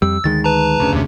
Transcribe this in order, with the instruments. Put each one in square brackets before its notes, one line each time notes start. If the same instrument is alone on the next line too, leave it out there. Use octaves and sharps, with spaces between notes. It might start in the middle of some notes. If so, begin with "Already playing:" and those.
[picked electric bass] F2 G3 [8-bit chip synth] E6
[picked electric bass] D2 D#3 G#3 [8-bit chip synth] A6
[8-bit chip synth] B4 A5 A#5
[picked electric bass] F#1 D2 C#3
[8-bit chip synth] D#2 C3